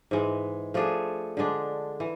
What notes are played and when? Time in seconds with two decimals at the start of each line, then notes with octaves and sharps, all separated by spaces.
0.11 G#2 E3 G#3
0.74 F3 A3 D4 G#4
1.37 D3 G#3 D4
2.00 E3